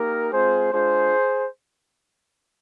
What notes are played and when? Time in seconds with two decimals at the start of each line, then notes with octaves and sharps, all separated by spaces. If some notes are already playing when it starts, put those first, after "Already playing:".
Already playing: A#3 D#4 G4 A#4
0.31 G#3 C4 F4 G#4 C5
0.73 G#3 D4 F4 G#4 C5